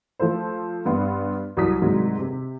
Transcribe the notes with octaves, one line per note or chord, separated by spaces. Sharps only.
F3 A3 A4 C5
G2 B3 C6
C2 F#3 D#6 B6
G#2 C3 D#3 F#3 G3
C3